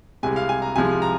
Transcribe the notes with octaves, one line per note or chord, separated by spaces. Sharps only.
C2 C3 G#3 G#5
F5
G#5
A#5
C2 C3 F3 G#3 G#5
A#5